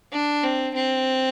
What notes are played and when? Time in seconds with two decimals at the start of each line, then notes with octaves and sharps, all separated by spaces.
0.12 D4
0.43 C4
0.75 C4